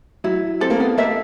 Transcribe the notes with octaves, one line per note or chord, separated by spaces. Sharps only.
F#3 E4
C4 A4
A#3
B3
A#3 E5